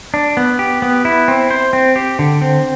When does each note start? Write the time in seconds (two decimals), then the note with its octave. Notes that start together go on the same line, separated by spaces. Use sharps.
0.14 D4
0.37 B3
0.59 G4
0.82 B3
1.05 E4
1.28 C4
1.50 C5
1.73 C4
1.96 G4
2.19 D3
2.41 C4